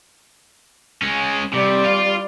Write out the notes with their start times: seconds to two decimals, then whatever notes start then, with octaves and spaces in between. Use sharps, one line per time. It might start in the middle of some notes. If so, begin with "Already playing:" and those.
1.02 G#3 C#4
1.53 C3 G3 D5
1.85 F4